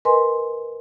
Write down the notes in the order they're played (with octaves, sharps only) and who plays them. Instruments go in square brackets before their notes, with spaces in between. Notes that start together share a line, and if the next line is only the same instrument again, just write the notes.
[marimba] A#4 B4 D#5 G#5 C6